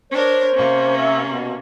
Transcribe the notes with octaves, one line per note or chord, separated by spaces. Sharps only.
D4 A#4 C5 C#5
C3 A#3 C#4
E5
B2